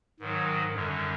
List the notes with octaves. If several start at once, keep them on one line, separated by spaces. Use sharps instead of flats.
G#2 D#3 F#3
F#2 D3 G3